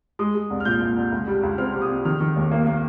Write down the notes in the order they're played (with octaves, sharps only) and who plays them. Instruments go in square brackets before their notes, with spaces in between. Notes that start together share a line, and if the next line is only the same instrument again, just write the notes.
[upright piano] G#3 D#6
G#3
C2
F6
A#2 G6
A#2
C2
C#2
G3
C#2
C4 F6
C3
D#6
C3
D#3 F6
D#3
D#2
A#3
A#3